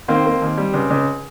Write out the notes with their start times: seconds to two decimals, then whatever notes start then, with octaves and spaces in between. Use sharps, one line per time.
0.08 D#3 A#3 C4
0.25 A#3
0.42 D#2
0.57 G3
0.74 C#2
0.90 C#2